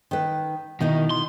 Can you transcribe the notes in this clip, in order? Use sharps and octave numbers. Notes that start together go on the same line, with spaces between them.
D#3 B4
B2 D#3 D#4 E4
C6